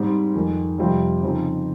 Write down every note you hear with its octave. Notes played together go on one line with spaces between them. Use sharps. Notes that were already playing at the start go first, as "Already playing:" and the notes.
Already playing: G#2 G3 C4
F2 D#3 G#3
F2 C3 G3 C4 F4
C#3 F3 C4 D#4